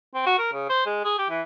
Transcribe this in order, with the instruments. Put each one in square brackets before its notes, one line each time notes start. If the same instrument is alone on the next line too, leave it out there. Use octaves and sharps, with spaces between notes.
[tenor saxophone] C4
F#4
A#4
C#3
C5
G#3
G#4
G4
E3